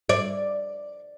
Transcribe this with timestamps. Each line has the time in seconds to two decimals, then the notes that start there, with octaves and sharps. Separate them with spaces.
0.09 D5